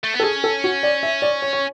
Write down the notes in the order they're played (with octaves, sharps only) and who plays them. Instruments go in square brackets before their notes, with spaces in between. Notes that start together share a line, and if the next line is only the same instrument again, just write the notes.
[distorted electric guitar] A3
B3
[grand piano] A4
[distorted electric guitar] C#4 [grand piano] G#4
[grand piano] A4
F#4
D5
E5
D5
C#5
C#5